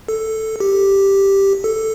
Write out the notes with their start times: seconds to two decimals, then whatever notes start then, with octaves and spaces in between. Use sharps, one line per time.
0.08 A4
0.60 G4
1.64 A4